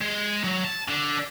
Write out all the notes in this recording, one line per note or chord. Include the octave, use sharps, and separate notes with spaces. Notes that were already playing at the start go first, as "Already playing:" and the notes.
G#3
F#3
A5
D3